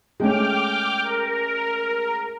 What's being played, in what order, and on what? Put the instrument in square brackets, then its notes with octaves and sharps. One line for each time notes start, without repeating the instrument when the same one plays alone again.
[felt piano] G#3 A3 C#4 [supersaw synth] G5 D6 F6
[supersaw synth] A#4